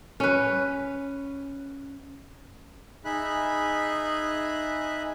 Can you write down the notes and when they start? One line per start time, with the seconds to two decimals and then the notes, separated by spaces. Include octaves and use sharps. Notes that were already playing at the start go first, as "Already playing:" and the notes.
0.20 C#4 B4
3.05 D#4 G#4 E5 B5 F#6